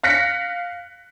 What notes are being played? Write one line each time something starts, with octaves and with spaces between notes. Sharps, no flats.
F5 F#6 A#6 B6 C#7